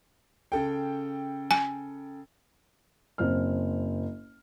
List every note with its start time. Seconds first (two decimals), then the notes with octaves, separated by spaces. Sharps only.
0.52 C#3 A4 G5
1.51 G#5
3.18 F#1 C4 F6